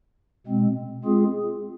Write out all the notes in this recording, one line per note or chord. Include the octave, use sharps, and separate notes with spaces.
B2 G#3 C4
G#3 C4 F4 G#4